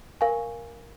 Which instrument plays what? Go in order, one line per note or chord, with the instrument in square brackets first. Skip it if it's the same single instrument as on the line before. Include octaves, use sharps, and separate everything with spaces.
[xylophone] A#4 F5 G#5 C#6